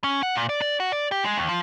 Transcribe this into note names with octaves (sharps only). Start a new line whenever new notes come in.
C#4
F#5
A#2
D5
D5
F#4
D5
G4
G#3
D#2
F3